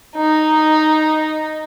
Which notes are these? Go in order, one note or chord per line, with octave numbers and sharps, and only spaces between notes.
D#4